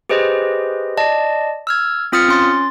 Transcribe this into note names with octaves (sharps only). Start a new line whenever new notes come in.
G4 G#4 B4 C5 D#5
D5 D#5 A5
E6 F6 G#6
C4 F4 D#6 F6 A6 C#7
C#4 C6 A6